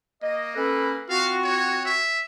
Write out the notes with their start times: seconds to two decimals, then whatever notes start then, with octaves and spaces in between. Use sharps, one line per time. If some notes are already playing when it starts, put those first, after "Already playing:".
0.23 A#3 D#5
0.56 C#4 A4 B4
1.09 C4 F4 F#4 F5
1.44 C#5
1.85 E5